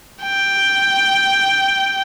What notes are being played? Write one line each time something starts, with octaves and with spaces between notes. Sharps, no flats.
G5